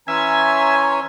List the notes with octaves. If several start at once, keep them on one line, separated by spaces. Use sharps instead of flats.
E3 C#4 C#5 E5 G#5 A#5 C6